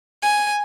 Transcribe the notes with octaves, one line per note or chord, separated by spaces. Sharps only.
G#5